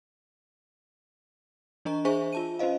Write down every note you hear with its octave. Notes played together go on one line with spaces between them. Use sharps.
E3 D4 D#5 A#5 C#6
D4 G#4 C5 E5 G#5 C#6
F4 A5 D#7
C#4 F4 C5 D#5 F5